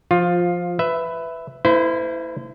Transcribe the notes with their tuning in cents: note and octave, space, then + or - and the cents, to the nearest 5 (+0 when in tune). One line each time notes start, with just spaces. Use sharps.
F3 +0 F4 +15
B4 +15 E5 +0
A#3 -45 E4 -5 C5 -45